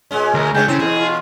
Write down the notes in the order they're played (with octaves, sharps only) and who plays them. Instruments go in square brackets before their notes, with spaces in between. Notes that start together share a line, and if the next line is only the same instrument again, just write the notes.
[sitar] A#2 G#3 C#4
[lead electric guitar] D2 [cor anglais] A#4
[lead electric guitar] C#2 [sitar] A3 D4 C#5 [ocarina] G#4 [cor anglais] G5
[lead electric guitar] C#3 [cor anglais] C4 [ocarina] E4 [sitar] A4
[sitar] E2 B2 [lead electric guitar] G#4
[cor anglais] F4